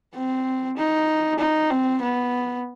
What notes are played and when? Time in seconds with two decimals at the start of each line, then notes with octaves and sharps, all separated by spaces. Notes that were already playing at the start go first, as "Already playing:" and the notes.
0.14 C4
0.77 D#4
1.39 D#4
1.70 C4
2.02 B3